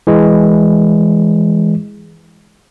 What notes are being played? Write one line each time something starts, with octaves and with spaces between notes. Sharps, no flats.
E3 G#3